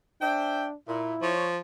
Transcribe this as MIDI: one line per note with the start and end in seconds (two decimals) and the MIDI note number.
0.22 0.75 62
0.22 0.65 72
0.22 0.65 76
0.22 0.65 79
0.88 1.15 46
0.88 1.33 64
1.22 1.59 53
1.22 1.47 73